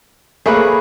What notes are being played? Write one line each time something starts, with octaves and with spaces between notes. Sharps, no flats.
A3 A#3 G#4 B4 C#5 B5